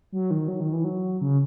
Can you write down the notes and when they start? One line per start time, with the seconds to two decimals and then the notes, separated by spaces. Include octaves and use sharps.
0.12 F#3
0.31 D#3
0.48 F#3
0.60 D#3
0.73 E3
0.84 F#3
1.21 C#3